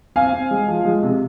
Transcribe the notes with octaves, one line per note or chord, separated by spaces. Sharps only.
C4 F5 G#5
C4
G#3
F3
G#3
C3